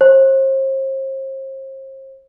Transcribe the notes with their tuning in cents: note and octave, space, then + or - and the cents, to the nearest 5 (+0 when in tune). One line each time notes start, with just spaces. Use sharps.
C5 +40